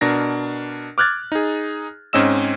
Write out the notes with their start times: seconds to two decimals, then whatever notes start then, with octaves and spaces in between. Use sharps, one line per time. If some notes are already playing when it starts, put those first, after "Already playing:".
0.01 B2 D4 A#4 A#6
0.98 D6 F6 F#6 G#6 A6
1.32 D#4 G#4
2.13 G#2 C4 C#4 D#5 E6 E7